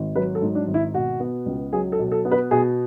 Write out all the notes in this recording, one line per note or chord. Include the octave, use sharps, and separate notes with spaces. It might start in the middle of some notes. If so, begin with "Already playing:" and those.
Already playing: G#1
F#3 B4
A4
G#2
D4
G#1
E4
B2 F#4
B3
C#2
F#3 G#4
A4
B2
A4
B3
B4
B2 G#4